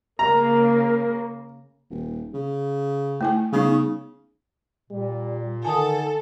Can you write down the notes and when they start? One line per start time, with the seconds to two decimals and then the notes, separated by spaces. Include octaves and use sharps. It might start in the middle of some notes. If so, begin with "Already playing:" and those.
0.19 C#3 A#3 A#4 A#5
1.90 D#1
2.34 C#3
3.21 A3 E4 G#5
3.52 C#3 G3 B3 D#4
4.91 A#2 G3
5.65 D3 D#3 A4 G#5 A5 D#6